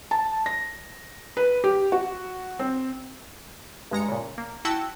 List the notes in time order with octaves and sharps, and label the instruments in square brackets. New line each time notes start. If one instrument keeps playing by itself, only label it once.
[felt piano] A5
A#6
B4
G4
F#4
C4
[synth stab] G2 G#3 A#5 C#7
A#2 C#3
A#3
E4 F#4 G5 A5 E6